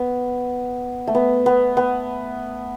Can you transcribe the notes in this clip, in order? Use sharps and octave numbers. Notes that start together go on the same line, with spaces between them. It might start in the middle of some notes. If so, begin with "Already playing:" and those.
Already playing: B3
A3
B3
B3
B3